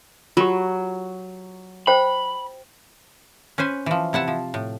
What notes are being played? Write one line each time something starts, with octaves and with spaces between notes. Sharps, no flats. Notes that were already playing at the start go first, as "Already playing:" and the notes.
F#3 F4 G4
C5 G5 B5
C#4 B4 C5 G#5
E3 F3
C3 E4 F#5 A5
F3
A2